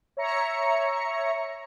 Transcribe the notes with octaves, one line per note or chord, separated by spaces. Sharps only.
C#5 E5 A#5 C#7